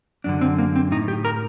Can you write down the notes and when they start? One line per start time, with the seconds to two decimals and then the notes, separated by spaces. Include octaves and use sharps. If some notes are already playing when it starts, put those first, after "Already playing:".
0.24 F#2 D3 D4
0.41 C4
0.58 A#3
0.75 C4
0.92 A2 D#4
1.08 G4
1.25 A#4